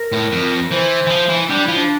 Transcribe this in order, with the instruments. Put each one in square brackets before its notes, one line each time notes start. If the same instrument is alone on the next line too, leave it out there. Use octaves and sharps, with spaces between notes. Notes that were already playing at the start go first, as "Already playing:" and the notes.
Already playing: [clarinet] A#4
[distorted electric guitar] A2
F2
[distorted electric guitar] E3 [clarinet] C5
[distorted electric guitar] E3
F3
E3
[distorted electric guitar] G3 [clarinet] D4
[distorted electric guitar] F3 [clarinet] E4
[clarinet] D4